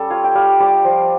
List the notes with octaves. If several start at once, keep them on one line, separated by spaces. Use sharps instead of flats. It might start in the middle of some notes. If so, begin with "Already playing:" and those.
Already playing: G3 C#4 G4 A4
F4 C#5
G5
G3 F5
G3 D5
F3